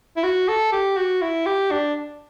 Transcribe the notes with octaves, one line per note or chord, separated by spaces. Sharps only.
E4
F#4
A4
G4
F#4
E4
G4
D4